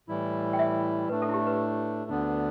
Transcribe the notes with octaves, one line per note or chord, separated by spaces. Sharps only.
A2 E3 G3 E4
G5
E5
A2 A3 D4 B4
A4
E4
G4
B4
D2 D3 B3 D4